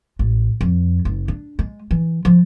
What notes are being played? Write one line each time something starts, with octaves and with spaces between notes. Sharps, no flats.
A1
F2
F#1
D4
G#3
E3
F3